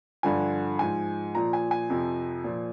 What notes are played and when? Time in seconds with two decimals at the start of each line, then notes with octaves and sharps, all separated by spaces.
0.23 G2 D3 F3 G#5
0.79 G#2 F3 G#5
1.34 A#2 F3 A#5
1.53 G#5
1.71 G#5
1.90 F2 C3 F3
2.44 A#2 F3